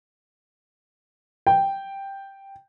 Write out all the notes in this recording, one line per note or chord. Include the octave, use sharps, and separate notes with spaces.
G5